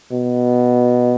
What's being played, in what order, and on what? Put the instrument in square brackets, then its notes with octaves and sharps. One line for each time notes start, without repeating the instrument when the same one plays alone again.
[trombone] B2